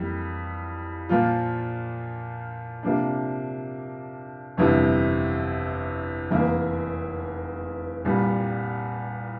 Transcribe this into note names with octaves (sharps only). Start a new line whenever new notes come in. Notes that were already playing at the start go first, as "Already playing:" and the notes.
Already playing: F2 E3 G3 A#3
A#2 F3 A#3 F4
C3 F3 A#3 D4
G1 F2 C3 E3
F1 E2 E3 A#3 E4
C2 A#2 G3